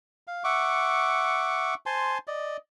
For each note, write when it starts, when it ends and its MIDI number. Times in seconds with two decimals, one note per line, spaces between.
0.27 0.43 77
0.44 1.74 76
0.44 1.74 78
0.44 1.74 85
0.44 1.74 86
1.86 2.18 72
1.86 2.18 80
1.86 2.18 81
1.86 2.18 84
2.27 2.57 74
2.27 2.57 75